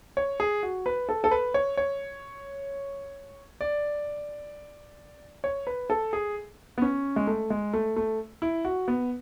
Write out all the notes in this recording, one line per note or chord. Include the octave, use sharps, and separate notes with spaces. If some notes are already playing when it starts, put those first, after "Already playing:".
C#5
G#4
F#4
B4
A4
A4
B4
C#5
C#5
D5
C#5
B4
A4
G#4
B3
C#4
G#3
A3
G#3
A3
A3
E4
F#4
B3